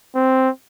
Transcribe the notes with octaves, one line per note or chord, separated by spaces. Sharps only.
C4